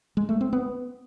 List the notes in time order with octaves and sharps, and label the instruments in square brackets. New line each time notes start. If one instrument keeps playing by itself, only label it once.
[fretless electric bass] G#3
A3
C4
B3